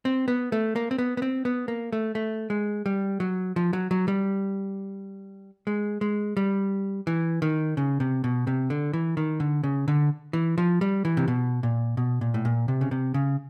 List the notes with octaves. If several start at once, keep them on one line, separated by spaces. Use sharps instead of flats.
C4
B3
A3
A#3
C4
B3
B3
C4
B3
A#3
A3
A3
G#3
G3
F#3
F3
F#3
F#3
G3
G#3
G#3
G3
E3
D#3
C#3
C3
B2
C3
D3
E3
D#3
D3
C#3
D3
E3
F3
G3
E3
C3
B2
A#2
B2
A#2
A2
A#2
C3
C#3
C3
C#3